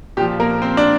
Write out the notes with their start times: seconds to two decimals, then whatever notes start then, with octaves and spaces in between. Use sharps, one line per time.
0.17 A#2 F3 G4
0.40 A#3 A#4
0.62 C4 C5
0.77 D4 D5